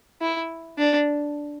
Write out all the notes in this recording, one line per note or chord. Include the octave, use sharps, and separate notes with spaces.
E4
D4